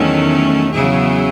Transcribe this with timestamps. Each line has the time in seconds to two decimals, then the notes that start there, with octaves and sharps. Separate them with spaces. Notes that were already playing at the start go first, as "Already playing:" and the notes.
Already playing: E2 D#3 F#3 A3 C#4
0.73 E2 C#3 F#3 E4 G#4